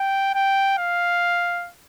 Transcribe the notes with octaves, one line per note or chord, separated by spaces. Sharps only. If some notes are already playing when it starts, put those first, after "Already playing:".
Already playing: G5
G5
F5